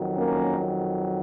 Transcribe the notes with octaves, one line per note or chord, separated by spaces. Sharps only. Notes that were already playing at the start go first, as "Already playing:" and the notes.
Already playing: F2 D#3 F#3
A#3 C#4